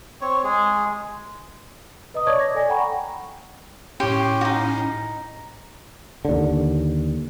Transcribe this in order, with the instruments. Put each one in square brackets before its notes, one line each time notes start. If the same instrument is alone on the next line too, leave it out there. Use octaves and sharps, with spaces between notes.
[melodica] C4 C#5
G#3 G#4
[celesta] B4 D#5 A#5 D#6
C#5 D5 A5 C#6 D6 G#6
A#6
A4 D5 G#5 A#6
F#5 G5 A#5 B5 C#6
[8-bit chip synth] A2 C#4 [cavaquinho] G4 C#5 C6
[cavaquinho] D#4 F#4
[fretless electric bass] D#2 D3